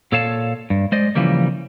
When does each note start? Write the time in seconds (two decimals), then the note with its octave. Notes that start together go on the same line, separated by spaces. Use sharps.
0.12 A#2 A4 C#5 F5 A5
0.70 G2
0.92 G#3 C5 D5 D#5
1.15 C#3 E3 F3 G3 A#3